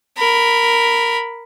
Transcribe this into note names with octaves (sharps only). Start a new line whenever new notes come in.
A#4 B5